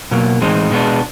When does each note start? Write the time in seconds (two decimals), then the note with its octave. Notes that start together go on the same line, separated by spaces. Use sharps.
0.11 B2 F#3 A#3
0.41 A2 E3 G#3 C4 D#4
0.71 B2 G#3 B3 D4